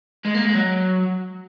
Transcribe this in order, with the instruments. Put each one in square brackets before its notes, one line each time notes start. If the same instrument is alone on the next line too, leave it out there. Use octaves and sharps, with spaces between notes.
[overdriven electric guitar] G#3
A#3
G#3
F#3